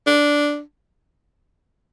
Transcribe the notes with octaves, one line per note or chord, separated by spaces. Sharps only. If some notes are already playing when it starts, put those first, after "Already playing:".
D4